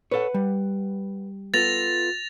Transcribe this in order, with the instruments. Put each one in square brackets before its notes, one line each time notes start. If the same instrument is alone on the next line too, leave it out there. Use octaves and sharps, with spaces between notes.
[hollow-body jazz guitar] A4 C#5 [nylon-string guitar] B4 F#5
[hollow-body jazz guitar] G3
[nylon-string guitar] B3 F4 A4 [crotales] A6 A#6 F7